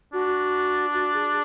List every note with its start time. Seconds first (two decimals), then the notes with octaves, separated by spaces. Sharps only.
0.13 D4 F#4
0.94 F#4
1.14 G#4